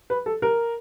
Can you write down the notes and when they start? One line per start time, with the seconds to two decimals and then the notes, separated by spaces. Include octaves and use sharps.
0.10 B4
0.26 A4
0.42 A#4